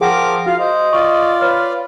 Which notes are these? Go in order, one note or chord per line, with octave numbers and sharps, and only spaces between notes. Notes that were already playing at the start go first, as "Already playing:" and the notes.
F3 G#4 A#4 F#5 G5 D6
F4 F#4 F5
C5 D#5
F4 D5 C#6
B4 C#5 F6